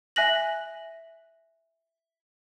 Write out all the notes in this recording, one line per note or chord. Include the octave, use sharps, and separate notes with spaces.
E5 G#5 F#6 A#6 F#7